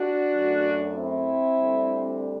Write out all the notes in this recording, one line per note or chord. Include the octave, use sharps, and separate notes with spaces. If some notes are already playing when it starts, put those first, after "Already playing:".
Already playing: D4 F#4
F#2 F#3 A3
C4 E4
D2 D3 G3